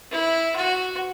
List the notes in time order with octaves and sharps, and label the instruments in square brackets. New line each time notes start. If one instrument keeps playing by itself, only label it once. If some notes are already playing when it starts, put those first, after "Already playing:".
[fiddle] E4
F#4